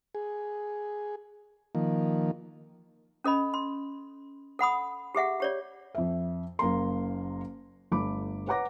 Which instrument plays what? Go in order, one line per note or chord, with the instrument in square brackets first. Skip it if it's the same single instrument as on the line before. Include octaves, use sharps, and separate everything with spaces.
[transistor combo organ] G#4
D#3 F3 A#3
[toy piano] C#4 A4 D#5 B5
C6
A4 F#5 B5 D#6
G4 G#4 E5 F#5
G4 C#5 D5
[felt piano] F2 E5
F#1 A#3 A#5 C6
G1 A3 B5 D6
B4 C#5 F#5 A#5 D6 A#6